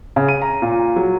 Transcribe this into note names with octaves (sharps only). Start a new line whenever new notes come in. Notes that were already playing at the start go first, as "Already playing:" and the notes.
C#3
D#7
A#5
A#2
F#3